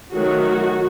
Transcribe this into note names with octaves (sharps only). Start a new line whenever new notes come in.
D#3 F#3 A3 F#4